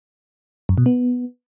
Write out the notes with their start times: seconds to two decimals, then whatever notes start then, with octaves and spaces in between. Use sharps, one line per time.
0.69 F#2
0.78 B2
0.86 B3